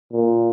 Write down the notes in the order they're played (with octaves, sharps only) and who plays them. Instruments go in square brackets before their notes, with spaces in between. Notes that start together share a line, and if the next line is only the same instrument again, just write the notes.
[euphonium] A#2